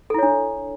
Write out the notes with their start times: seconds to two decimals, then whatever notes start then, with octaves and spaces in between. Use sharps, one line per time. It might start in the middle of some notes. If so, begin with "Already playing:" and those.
0.10 A4
0.14 E4
0.19 C#5
0.23 D4